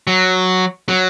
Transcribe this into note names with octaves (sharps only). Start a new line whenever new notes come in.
F#3
F#3